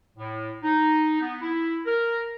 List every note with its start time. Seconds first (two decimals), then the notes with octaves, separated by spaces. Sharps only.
0.17 A2
0.63 D#4
1.21 B3
1.41 E4
1.85 A#4